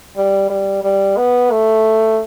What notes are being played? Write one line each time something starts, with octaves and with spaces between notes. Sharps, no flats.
G3
G3
G3
B3
A3